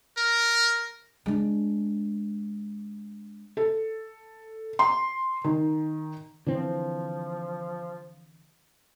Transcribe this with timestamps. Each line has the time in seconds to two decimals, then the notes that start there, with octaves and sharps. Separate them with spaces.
0.17 A#4
1.26 G#3 D4
3.57 A4
4.79 C6
5.44 D#3
6.47 D3 E3 F3 C4